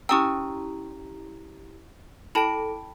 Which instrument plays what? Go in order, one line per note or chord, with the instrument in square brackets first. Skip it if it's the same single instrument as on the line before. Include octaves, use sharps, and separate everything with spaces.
[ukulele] C#4 G5 [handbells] E4 G4 A#5 [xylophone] C#6 D#6 E6
[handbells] E4 A4 D7 [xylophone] G5 A5 B5